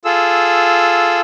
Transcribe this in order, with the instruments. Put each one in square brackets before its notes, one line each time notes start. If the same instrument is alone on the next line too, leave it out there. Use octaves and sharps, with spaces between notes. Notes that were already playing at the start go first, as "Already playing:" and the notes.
[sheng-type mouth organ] F4 G#4 A4 E6